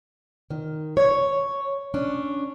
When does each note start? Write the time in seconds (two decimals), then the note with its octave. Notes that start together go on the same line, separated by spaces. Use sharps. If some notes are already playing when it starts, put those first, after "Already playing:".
0.50 D#3
0.97 C#5
1.94 C#4 D4